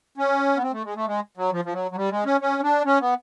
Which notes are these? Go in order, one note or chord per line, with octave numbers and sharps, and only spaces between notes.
C#4
B3
C4
A3
G#3
A3
G#3
F#3
F3
F3
F#3
F#3
G3
G#3
C#4
C#4
D4
C#4
B3